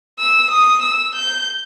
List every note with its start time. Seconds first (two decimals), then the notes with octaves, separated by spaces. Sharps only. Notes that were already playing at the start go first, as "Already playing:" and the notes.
0.19 E6
0.51 D#6
0.82 E6
1.15 G6